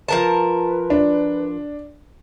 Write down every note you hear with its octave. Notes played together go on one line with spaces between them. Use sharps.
F3 A#4 B4 A5
D4